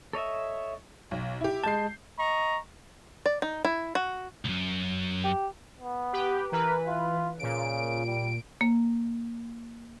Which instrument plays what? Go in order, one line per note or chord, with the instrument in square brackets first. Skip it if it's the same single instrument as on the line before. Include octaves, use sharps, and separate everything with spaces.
[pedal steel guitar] A4 C#5 D#5 E5
[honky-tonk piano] B1
E4 G4
[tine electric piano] G#3 A5 [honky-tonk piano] G6 C7
[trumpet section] D#5 A#5 C#6
[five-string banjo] D5
D#4
E4
F#4
[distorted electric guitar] C#2 F#2
[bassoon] G4
[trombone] B3
[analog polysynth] G4 B4
[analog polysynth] E3 B4 [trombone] A#4
[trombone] F4
[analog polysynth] A#2 D7 [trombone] C#3
[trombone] G3
[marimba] A#3